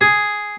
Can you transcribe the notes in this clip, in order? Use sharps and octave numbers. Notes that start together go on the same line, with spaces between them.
G#4